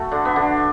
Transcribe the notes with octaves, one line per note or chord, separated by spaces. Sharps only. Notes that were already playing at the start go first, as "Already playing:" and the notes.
Already playing: A3 F#4 A4
D3 D4
B3
D3 D4